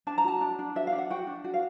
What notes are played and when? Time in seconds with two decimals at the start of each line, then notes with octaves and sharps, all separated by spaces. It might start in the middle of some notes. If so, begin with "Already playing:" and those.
0.07 D4 A5
0.18 A#5
0.24 F#4 A5
0.41 D4
0.59 D4
0.76 F#4 E5
0.87 F5
0.92 D4
0.98 F#5
1.10 F#4 G5
1.27 D4
1.44 F#4
1.54 F5